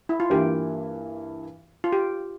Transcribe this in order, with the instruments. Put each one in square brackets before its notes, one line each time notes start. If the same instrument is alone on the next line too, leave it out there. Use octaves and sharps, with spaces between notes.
[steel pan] E4
F4
[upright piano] G2 E3 A#3 E4 [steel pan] G4
[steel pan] F4
G4